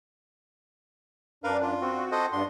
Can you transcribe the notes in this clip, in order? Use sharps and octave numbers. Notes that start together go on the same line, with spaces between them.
F#2 D4 A#4 B4 F5
F4
C4 F#4
A4 C5 D#5
G2 B3 D4 C6